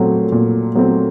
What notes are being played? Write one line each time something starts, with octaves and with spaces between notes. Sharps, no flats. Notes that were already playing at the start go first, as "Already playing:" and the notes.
Already playing: A#2 F#3 A3 C4
A#2
F#3 A3 C4